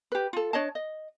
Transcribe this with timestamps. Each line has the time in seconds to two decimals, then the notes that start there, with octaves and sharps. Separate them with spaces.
0.12 G4 B4
0.33 F4 A4
0.53 D4 C#5 D#5 A5
0.75 D#5